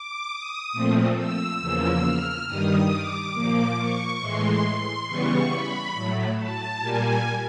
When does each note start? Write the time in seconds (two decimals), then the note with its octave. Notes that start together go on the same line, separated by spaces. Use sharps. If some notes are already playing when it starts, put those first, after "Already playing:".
Already playing: D6
0.30 D#6
0.72 A#2 F3 A3 C4
1.17 E6
1.59 E2 C#3 F3 A#3 E6
2.03 F6
2.47 G2 D#3 G3 D#6
2.90 D6
3.34 A#2 F3 A#3
3.78 C#6
4.20 A2 E3 G#3 C6
5.07 C#3 E3 G3 B3 C#6
5.51 B5
5.94 A2 F#3 A3
6.38 A5
6.80 A#2 G3 A#3 G#5